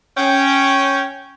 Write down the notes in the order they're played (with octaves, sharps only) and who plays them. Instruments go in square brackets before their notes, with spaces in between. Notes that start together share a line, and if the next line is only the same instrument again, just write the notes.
[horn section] C#4 G5